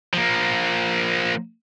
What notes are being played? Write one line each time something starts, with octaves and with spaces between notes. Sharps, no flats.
F3 A#3